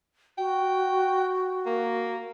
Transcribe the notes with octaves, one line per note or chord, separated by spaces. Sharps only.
F#4 G5
A#3